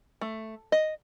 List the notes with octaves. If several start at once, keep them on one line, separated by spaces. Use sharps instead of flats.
A3
D#5